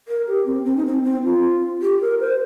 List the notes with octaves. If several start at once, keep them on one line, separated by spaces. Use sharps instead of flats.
A#4
G4
C4
C4
D#4
C4
C4
F4
G4
A#4
C5